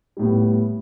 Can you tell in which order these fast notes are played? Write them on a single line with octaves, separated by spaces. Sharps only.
G3 A2 B3